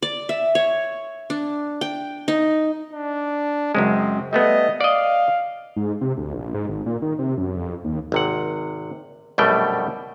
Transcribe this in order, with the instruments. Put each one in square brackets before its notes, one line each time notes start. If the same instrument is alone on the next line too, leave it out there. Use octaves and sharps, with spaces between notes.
[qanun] D5
E5
C#5
D4
G5
D#4
[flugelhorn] D4
[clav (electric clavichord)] F#2 C#3 G#3 [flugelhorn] C4
[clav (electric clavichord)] G3 A3 B3 [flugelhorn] D#5
[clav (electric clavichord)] D5 D#5 [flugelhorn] F5
[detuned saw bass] G#2
C3
D2
A#1
G#2
G#1
A#2
D#3
C3
F#2
F2
D#2
[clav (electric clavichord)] G#1 C3 F#5
A#1 F#2 B2 G3 A3 G5